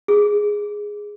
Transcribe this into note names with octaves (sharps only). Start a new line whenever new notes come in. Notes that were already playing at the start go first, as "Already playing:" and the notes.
G#4